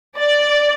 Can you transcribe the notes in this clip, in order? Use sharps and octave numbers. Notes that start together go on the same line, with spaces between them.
D5